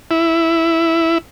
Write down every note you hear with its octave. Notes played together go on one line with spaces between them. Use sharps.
E4